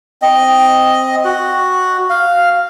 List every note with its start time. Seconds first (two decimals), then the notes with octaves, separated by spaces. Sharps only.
0.22 C4 D#5
1.25 F#4
2.10 F5